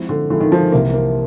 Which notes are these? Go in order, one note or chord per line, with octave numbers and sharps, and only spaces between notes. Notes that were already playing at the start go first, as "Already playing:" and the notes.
Already playing: F3 G#3 C4 E4
D3
D3 F3 G#3 C4 E4
D#3
F3
C2 C3 E3 A#3
A#3